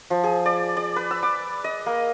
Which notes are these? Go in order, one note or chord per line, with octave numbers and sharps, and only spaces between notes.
F3
G#4
D5
D5
B4
E6
D6
D#5
A#3